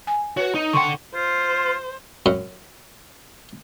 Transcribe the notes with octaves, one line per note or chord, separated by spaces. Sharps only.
G#5
F#4 B4 C#5
D#4
D3 F#5 G5 C6 C#6
F4 C5
F#2